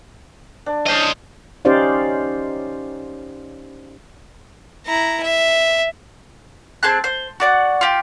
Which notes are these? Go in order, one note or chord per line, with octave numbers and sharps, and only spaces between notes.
D4
C#4 D4 C5 D#5 A5
C#4 D#4 G4 C5 D5 F5
E4 A#5
E5
C4 G#4 A5 F#6
C5
F#4 D5 F#5
F4 G4